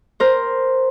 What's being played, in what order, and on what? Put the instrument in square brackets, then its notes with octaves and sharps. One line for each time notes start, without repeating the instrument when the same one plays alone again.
[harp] A#4 C5